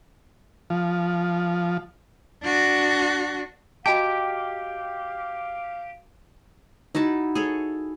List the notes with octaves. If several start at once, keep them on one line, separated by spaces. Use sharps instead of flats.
F3
D4 F#4
F#4 G4 D#5 F5 G5 A5
D#4 E4 F#4 A5
G#4 A4 C#5